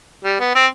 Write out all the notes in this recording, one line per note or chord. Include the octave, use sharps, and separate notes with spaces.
G3
B3
C4